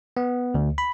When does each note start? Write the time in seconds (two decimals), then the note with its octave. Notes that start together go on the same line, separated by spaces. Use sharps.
0.17 B3
0.54 D2
0.78 B5